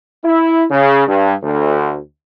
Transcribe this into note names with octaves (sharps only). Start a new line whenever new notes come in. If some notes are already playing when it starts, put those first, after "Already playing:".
E4
C#3
G2
D2